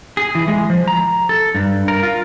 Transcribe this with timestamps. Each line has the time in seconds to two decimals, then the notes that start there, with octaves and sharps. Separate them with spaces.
0.17 G#4
0.35 E3
0.48 G#3
0.70 F3
0.88 A#5
1.29 A4
1.55 G2
1.88 A#4
2.03 F4